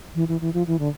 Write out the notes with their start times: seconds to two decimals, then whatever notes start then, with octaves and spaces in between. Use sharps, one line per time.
0.15 E3
0.28 E3
0.41 E3
0.54 F3
0.67 E3
0.79 D3